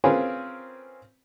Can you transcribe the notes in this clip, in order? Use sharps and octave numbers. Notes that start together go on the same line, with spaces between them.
C4 C#4 F4 G#4 A#4 B4